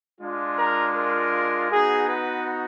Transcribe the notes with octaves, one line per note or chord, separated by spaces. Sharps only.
G#3 D4 F4
A#4
A#4
B3 D#4 F#4 G#4
B4